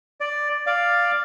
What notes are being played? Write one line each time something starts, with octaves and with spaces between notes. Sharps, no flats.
D5
D5 F5